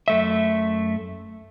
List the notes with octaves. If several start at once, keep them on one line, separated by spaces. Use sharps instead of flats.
F#2 A3 E5